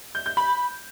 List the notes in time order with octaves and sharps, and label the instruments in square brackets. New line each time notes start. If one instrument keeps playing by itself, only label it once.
[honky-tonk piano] G6
G6
B5